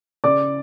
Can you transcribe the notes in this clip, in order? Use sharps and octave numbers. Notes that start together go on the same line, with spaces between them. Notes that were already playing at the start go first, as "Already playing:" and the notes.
C#3 D5 D6